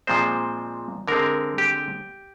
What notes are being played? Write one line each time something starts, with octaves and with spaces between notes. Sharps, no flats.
A#2 F3 G#3 C4 C5
D3 G#3 C4 A#4
G4